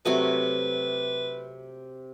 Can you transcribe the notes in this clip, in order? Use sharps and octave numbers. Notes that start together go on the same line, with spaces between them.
C3 F#3 A3 B4